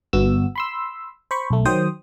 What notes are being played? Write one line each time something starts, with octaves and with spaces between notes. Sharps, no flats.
G1 B3 F#4 E6
B5 C6 E6
C5 B5 C#6
B1 A3
D#3 F#3 C5 G5 D#6